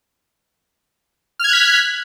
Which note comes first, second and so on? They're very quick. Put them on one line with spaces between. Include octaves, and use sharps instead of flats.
F6 G#6 F#6 B6